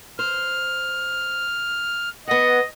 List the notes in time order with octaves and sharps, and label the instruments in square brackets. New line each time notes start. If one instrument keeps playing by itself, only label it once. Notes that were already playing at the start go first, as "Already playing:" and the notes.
[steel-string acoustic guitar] C5 [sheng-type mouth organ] F6
[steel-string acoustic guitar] B3 F#5 [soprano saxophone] D#5